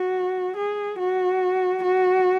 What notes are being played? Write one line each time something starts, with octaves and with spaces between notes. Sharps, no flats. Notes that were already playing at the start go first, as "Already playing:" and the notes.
Already playing: F#4
G#4
F#4
F#4